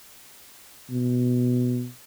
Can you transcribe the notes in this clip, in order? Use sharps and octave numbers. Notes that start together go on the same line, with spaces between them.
B2